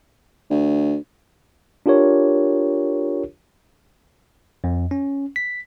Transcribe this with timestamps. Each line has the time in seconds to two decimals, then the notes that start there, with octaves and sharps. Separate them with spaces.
0.50 D2
1.86 D4 F4 G4 A#4 C#5
4.64 F2
4.91 C#4
5.36 B6